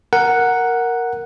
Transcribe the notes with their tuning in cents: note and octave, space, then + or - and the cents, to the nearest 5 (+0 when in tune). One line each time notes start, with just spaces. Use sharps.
A#4 +0 F#5 +0